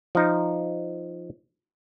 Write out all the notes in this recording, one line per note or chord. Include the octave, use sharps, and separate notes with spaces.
F3 D#4